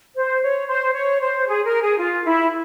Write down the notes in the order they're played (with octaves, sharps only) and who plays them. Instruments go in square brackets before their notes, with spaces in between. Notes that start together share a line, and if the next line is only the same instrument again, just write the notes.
[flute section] C5
C#5
C5
C#5
C5
G#4
A#4
G#4
F4
E4